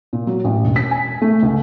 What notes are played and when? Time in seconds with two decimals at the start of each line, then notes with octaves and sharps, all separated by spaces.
0.13 A#2
0.27 F#3
0.44 A1
0.64 E1
0.76 B6
0.91 G#5
1.22 A3
1.43 C#2